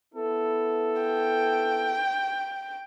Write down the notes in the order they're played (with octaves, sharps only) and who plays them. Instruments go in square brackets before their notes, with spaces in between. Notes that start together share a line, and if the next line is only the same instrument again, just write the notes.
[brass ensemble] B3 E4 A4
[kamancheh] G5